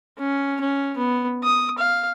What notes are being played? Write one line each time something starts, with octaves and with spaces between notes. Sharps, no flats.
C#4
C#4
B3
D#6
F5